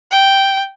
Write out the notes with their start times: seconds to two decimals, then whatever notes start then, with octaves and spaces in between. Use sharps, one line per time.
0.12 G5